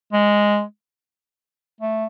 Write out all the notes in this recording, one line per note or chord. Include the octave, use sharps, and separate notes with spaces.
G#3
A3